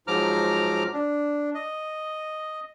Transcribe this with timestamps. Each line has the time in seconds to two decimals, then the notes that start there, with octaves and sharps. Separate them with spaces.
0.07 G#2 F3 F#3 A#5 D6 F6
0.94 D4
1.55 D#5